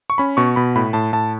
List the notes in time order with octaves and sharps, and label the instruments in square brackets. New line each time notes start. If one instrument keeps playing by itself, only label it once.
[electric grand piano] C#6
C#4 B5
B2 C#6
B2 B5
A2 B5
A2 A5
A2 A5